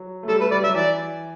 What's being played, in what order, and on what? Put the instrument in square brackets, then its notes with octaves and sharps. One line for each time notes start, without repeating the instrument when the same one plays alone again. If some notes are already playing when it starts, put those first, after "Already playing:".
Already playing: [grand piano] F#3
A3
[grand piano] G3 [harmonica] A4
[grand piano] A3 [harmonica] B4
[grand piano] G3 [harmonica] D5
[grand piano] F#3 [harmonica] E5
[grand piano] E3 [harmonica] D5